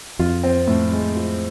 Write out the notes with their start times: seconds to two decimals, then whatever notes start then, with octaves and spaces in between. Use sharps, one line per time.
0.19 F2 F4
0.43 C4
0.67 A2
0.92 G#3
1.16 F4